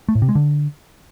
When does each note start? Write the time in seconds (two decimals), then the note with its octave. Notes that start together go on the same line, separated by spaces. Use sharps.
0.09 A3
0.15 A2
0.22 C3
0.29 G#3
0.35 D3